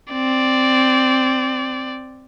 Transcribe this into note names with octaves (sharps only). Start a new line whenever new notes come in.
C4 D5